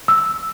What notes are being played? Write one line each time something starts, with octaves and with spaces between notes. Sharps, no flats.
E6